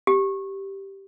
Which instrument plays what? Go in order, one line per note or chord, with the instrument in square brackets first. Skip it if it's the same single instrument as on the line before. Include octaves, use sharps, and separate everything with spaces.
[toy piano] G4